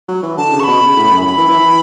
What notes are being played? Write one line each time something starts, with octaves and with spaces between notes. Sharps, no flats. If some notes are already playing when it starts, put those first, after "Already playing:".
F#3
E3
D3 A5
C#3
C#6
B2 B5
C#3
A2
F#2
F#2 B5
E3
E3
E3